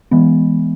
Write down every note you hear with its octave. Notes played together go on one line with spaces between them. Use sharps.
E3 G#3 B3